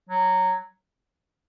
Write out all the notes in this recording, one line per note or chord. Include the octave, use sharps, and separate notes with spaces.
F#3